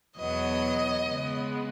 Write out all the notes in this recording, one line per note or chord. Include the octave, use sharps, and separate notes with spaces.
E2 B2 F#3 B3 D#5
C#3 G#3 B3